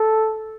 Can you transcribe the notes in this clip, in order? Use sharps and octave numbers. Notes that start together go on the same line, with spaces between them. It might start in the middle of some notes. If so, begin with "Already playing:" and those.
Already playing: A4